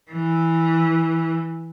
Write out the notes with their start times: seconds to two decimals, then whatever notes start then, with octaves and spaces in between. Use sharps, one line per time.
0.12 E3